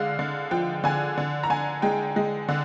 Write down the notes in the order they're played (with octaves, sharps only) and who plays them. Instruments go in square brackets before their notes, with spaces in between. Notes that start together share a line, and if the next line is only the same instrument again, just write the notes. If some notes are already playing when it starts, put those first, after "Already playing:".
Already playing: [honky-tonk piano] D3 G#3 F5
D3
F3 G5
D3 G#5
D3
A#5
D3 G#5
G#3 G5
G#3
D3